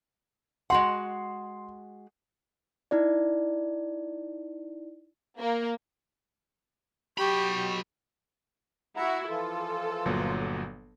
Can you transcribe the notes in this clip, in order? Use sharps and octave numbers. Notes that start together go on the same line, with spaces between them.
G#3 F#4 F#5 C6
D#4 E4 D5
A#3
F#3 G4 B5 C#6
E4 F#4 E5 F#5 A#5
E3 F3 F4 A4
G1 A#2 F#3